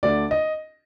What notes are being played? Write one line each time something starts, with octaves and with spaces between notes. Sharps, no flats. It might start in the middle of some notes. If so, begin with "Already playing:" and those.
D2 D3 D5
D#5